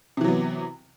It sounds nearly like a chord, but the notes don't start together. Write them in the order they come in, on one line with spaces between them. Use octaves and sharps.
C3 E3 F#3 B3